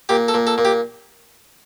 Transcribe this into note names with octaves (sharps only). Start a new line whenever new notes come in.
A#2 G4
A4
A#2
A4
A#2
G4